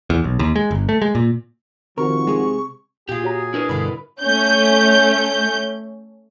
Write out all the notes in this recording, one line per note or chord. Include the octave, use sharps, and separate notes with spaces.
E2
B1
D#2
G#3
G1
A3
G#3
A#2
C3 D#3 F3 F#4 A#4 C#6
G#3 G#4
A#2 F4 G4 G#4
F#4 C#5 A#5
D4 E4 A#4 B4 C#6
G2 B2 D3 B5
A3 C#4 G6